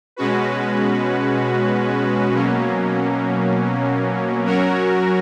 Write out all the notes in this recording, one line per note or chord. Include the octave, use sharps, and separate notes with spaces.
B2 G#3 C#4 F#4 B4
B2 F#3 A#3 C#4
F#3 C#4 F#4 A#4 C#5